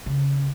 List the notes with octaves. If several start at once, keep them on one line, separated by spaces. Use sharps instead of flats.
C#3